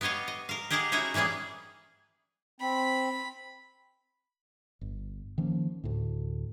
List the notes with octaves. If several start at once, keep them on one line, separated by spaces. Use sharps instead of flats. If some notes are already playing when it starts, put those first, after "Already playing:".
B3 G4 C#5 D#5 F5
D#5
A#4 F5
G4 G#4 A#4 D#5 F5 F#5
C#4 D#4 E4 F#4 G#5 A#5
E3 G3 A#3 C#4 G#4
C4 B5
G1
D#3 F3 A#3 C#4
D2 A2